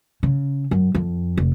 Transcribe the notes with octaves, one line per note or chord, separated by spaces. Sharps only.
C#3
F#2
F2
F1